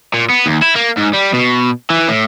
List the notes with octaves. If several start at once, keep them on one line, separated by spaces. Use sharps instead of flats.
A#2
B3
D#2
E4
A#3
G#2
G3
B2
E3
A2